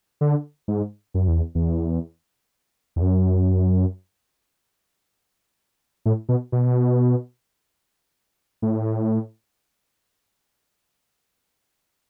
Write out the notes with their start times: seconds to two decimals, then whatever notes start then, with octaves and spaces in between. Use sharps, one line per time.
0.21 D3
0.68 G#2
1.14 F#2
1.28 E2
1.55 E2
2.96 E2
3.02 F#2
6.06 A2
6.29 B2
6.52 B2
8.62 A2